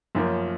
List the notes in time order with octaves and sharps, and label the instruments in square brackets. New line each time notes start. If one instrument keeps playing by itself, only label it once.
[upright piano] F#2 F3 A#3 C#4